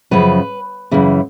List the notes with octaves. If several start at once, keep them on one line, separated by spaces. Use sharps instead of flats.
F#2 C#3 F3 B4
F#2 C#3 E3